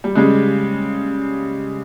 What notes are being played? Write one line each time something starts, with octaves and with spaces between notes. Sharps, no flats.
G3
C#3 G3 G#3